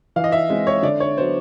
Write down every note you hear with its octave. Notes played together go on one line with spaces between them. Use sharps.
E3 F5
D#5
E5
G#3 C4
C#5
D3 D5
C#5
F#3 B3 C5